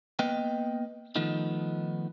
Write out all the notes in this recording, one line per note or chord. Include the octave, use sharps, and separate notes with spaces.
A#3 B3 B4 D#5 G5
D#3 F3 A3 B3 D#4